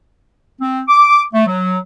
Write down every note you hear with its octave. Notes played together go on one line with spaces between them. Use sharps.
C4
D6
A3
F#3